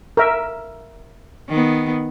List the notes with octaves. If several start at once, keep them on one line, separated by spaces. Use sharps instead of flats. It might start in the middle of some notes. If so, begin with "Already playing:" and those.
A#4 E5
D#3 B3